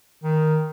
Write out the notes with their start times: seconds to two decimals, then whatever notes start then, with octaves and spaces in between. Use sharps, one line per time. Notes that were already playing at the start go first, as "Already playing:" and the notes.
0.23 D#3